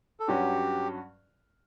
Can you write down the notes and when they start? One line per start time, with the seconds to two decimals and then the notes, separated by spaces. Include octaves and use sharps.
0.20 A4
0.28 G2 F#3 C#4 F#4 G4